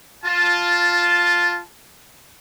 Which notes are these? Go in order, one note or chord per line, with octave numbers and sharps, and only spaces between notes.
F4 A5